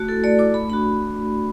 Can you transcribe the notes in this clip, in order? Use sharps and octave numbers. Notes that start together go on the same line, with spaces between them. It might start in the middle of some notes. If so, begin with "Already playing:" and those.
Already playing: A3 F#4
E4 A4
A3 D5
E4 D6
A3 B5
D4 F#4 B5